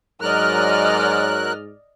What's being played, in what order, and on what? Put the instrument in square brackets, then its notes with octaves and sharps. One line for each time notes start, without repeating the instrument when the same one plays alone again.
[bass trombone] G#2 [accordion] F#3 A#4 F#6 [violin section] D5 D#5 F6